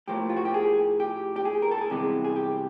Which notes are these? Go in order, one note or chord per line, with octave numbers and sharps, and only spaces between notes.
A2 F3 A#3 G4
F4
F#4
G4
G#4
G4
G4
G#4
A#4
A4
G#4
C2 C3 E3 G#3 B3 G4
G#4
G4